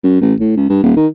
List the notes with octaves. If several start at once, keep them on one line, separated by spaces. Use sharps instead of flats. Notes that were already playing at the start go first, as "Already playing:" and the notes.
F#2
A1
A2
C#2
G2
D#1
D#3